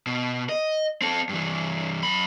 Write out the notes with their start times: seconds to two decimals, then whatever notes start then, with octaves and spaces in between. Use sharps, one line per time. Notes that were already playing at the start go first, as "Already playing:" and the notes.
0.07 B2
0.49 D#5
1.02 C4 A4
1.29 G2 E3
2.03 F#2 B5